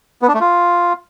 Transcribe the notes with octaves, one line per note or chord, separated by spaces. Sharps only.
B3
D4
A3
F4